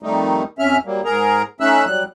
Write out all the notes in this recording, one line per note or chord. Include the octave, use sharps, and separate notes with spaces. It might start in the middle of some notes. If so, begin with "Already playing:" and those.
F2 D#3 G3 A3 D#4
F2 C#4 E5 F6
F#3 G3 A#3
G#2 G#4 A#4 A#5
A3 C#4 D#4 E5 E6 F#6
F#3 G3 F#6